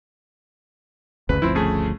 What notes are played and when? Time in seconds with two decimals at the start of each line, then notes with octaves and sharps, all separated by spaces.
1.29 F#1 D2 C#3 B4
1.42 G1 D2 F3 C4 E4
1.55 C#3 A3 G#4